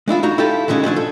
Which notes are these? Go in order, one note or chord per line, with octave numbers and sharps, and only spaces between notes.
G#3 D4 E4 F4
D#4 F#4 A#5
E4 F4 G4 A4
D3 E3 G#3 C#4 D#4
F3 F#3 C#4 D4
A4